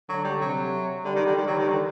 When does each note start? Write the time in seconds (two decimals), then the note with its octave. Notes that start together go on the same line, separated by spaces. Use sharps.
0.09 D3 F#3
0.24 G3
0.41 C3 F#3
1.04 D3 G3
1.15 D#3
1.26 D3
1.37 D#3 G3
1.47 F#3
1.58 D#3
1.68 D3